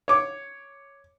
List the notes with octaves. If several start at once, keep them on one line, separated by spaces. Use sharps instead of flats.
C#5 D6